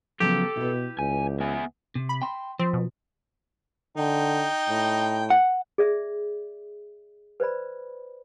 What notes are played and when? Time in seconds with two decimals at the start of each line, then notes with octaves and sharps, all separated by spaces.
0.20 C#3 F3 F#3 B3 G4 A4
0.56 B2 E4 B4
0.99 C#2 G#5
1.40 B3 E5 G#5
1.95 C3
2.09 B5
2.22 G5 C6
2.59 F3 C4
2.73 B2
3.97 D3 D#4 G5
4.69 A2
5.30 F#5
5.78 G#4 D5 E5
7.40 B4 C5 D5 B5